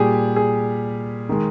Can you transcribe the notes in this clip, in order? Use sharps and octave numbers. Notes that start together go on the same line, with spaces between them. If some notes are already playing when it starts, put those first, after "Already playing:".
Already playing: A#2 G3 G4 G#4
G#4
D#3 G#3